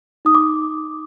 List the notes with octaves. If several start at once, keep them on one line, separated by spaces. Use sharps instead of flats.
D#4 D#6
D6